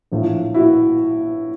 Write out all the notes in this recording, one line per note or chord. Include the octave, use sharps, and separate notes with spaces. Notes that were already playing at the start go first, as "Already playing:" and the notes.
A#1 A2 F3
E4 F#4